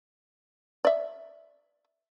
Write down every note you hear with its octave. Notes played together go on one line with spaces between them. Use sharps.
D5 E5